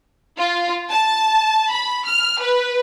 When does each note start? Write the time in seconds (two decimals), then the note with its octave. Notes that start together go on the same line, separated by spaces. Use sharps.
0.38 F4
0.91 A5
1.72 B5
2.05 F6
2.41 B4